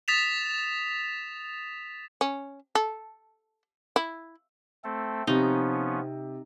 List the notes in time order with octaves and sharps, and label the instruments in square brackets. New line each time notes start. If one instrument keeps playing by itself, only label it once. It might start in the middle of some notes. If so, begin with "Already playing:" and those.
[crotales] D#6 A6 B6 E7 F7
[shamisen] C#4
A4
E4
[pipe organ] A3 C4 A4
[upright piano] C3 [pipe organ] F3 B3 C#4 [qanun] D#4